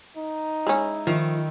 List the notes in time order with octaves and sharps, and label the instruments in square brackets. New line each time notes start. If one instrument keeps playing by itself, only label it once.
[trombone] D#4
[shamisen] G#3 C#4 [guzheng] E4
[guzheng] D#3 G3 A3 [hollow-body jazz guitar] F3